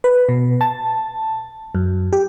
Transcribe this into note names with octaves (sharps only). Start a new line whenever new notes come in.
B4
B2
A5
F#2
G4